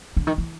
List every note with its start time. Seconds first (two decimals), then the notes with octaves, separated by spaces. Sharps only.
0.17 D3
0.27 D#3
0.38 E3